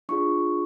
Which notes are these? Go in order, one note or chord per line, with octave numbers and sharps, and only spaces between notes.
D4 F4 G#4 C#6